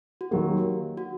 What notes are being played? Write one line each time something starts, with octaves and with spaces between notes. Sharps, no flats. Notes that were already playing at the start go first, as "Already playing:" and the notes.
F#4
D#3 F#3 A#3 G4
F#4